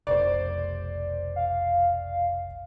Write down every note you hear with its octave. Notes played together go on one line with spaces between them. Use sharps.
F1 B1 C5 D5
F5